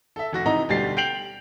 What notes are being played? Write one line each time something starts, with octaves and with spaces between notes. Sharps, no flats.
A4 E5
F1 F#4 A#6
C3 E3 D#4 D#5 A#5
D2 B2 G3 G4 A6 C7
G5 G6 C7 D7 F7 F#7